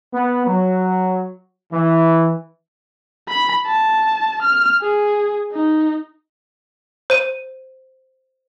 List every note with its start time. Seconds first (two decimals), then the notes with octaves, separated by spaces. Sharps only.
0.14 B3
0.47 F#3
1.72 E3
3.29 B5
3.67 A5
4.42 F6
4.82 G#4
5.52 D#4
7.10 C5 D#7